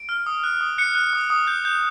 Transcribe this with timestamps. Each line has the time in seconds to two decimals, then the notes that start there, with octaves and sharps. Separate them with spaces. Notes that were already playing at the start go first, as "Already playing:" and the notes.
Already playing: D7
0.09 F6
0.26 D#6
0.44 F#6
0.61 D#6
0.78 F#6 C#7
0.95 F#6
1.13 D#6
1.30 D#6
1.47 G6
1.65 G6